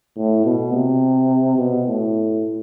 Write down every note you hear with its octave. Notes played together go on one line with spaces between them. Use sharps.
A2
B2
C3
B2
A2